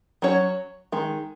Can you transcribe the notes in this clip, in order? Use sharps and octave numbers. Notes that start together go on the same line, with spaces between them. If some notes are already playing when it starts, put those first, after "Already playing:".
F#3 C#4 F#4 C#5
D#3 G#3